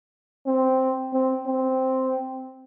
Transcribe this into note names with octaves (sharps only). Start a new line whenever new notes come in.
C4
C4
C4